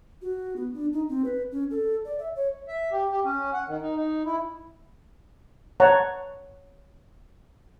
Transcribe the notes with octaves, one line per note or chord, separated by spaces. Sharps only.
F#4
B3
D4
D#4
C4
B4
C#4
A4
D5
E5
C#5
E5
G4
G4
C#4
F#5
D#3
D#4
D#4
E4
C#5 F#5 A5 A#5